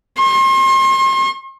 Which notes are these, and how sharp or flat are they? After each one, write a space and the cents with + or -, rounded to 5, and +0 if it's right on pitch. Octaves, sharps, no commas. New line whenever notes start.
C6 +40